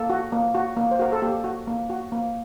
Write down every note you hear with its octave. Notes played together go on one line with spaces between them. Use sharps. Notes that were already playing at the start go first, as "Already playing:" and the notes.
Already playing: A#3 A4
F#4
A#3
F#4
A#3
C5
F#4 A#4
A4
A#3 G4
F#4
A#3
F#4
A#3